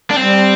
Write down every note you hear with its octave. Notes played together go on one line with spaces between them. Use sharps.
D4
G3 C4